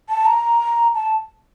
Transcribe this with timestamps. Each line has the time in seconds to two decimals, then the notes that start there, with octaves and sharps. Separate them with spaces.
0.09 A5
0.26 A#5
0.95 A5